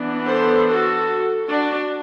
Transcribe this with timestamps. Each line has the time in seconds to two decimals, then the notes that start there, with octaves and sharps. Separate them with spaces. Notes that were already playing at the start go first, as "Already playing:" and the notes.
Already playing: E3 B3 D4
0.27 A4 C5
0.68 F#4 A4
1.48 D4 F#4